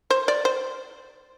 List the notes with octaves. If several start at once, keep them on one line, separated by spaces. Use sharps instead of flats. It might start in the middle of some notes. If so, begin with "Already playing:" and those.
C5
D5
C5